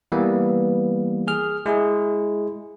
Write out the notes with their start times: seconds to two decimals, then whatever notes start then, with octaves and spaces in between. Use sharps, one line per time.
0.12 E3 G3 A#3 B3
1.28 G#4 F6
1.66 G#3 E4 G#4